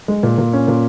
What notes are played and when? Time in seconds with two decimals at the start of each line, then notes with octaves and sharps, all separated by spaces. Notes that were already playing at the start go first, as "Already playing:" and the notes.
0.08 G#3
0.23 A#2
0.38 A#2
0.53 C#4
0.68 A#2